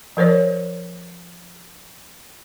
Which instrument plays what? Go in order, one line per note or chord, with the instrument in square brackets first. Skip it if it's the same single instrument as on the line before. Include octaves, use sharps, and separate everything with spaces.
[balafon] F3 A#4 C5 C#5